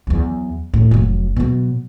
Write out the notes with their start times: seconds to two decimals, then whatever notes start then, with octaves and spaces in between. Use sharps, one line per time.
0.07 E2 F#3
0.74 A2
0.91 F1 F#3
1.36 B2 F#3